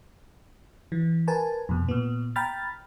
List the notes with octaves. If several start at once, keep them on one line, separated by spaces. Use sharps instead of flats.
E3
A#4 B4 G#5 A5
F2 B2
A#2 B3
G5 A#5 B5 F6 A6